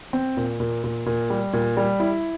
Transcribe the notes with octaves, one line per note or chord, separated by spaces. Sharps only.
C4
A#2
A#2
A#2
A#2
G3
A#2
G3
E4